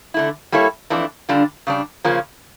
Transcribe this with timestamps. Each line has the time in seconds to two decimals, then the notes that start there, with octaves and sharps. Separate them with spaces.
0.14 D3 A3 E4
0.52 G3 A#3 E4 A4 C#5
0.90 F2 E3 A3 D4
1.29 D3 G3 D4 F4
1.67 C#3 G3 D4
2.04 C#3 F3 A#3 C#4 F4